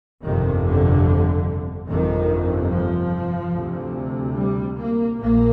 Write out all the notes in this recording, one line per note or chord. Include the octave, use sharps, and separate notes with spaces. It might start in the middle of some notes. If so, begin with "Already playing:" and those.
G1 F2 C3 D#3
D3
G1 F2 C3 D#3
F3
D2 C3
G3
A#3
A#1 A#2 A#3